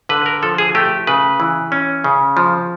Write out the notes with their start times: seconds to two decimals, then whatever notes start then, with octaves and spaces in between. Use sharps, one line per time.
0.09 D3 B4
0.26 A#4
0.43 F3 A4
0.58 G#4
0.75 A3 G4
1.07 C#3 B4
1.40 E3
1.72 C#4
2.04 C#3
2.37 F3